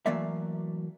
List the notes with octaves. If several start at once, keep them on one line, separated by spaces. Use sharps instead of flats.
E3 F#3 A3 A#3 D5 E5